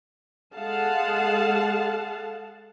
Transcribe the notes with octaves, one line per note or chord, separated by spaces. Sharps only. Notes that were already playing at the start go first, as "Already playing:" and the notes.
G#3 G#4 A4 F5 F#5 A5